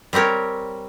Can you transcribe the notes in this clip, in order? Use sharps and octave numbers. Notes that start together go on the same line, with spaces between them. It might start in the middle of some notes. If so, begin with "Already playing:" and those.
G3 C4 G4 A#4 C#5